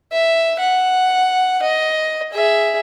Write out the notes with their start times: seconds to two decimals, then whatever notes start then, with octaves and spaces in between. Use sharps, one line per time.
0.12 E5
0.59 F#5
1.62 D#5
2.33 G#4 E5